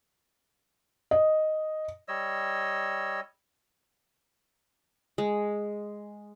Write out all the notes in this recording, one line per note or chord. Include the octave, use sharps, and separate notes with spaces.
D#5
G3 C#5 D#5 E6
G#3